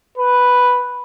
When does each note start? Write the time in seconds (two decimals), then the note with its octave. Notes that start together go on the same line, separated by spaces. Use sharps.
0.18 B4